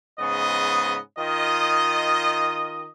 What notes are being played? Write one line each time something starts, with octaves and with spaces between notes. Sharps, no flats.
G#2 C#3 B3 D#5
D#3 F4 D#5